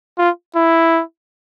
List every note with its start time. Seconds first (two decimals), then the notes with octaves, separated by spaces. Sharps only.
0.18 F4
0.56 E4